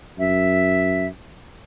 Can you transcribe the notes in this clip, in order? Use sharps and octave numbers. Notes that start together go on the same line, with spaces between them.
F#2 E5